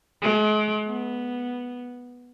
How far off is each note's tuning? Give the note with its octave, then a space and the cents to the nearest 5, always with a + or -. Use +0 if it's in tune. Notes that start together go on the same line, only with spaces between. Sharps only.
G#3 +40
B3 -5